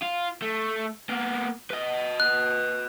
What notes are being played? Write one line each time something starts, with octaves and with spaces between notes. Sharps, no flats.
F4
A3
A#3 B3
B4 D#5
F#6